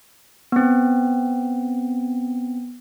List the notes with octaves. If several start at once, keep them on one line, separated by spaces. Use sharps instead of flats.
B3 C4